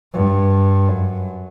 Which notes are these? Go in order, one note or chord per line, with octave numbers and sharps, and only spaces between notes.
G2
F#2